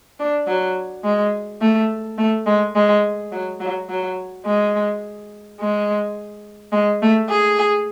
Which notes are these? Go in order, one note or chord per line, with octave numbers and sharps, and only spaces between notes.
D4
F#3
G#3
A3
A3
G#3
G#3
F#3
F#3
F#3
G#3
G#3
G#3
A3
G#4